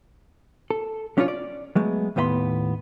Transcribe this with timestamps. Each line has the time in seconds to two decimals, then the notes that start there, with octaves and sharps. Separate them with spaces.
0.70 A4
1.17 F#3 C#4 D4 E4 F4 C#5
1.28 D5
1.75 F#3 G#3 A3 B3
2.16 D#2 A2 B3 E5 B5 C6